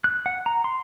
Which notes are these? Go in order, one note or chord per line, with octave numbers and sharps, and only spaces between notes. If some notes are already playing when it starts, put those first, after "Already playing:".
F#6
F#5
A#5
C6